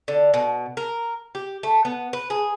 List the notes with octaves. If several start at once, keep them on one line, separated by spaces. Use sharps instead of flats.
D3
B2
A#4
G4
A3
B3
B4
G#4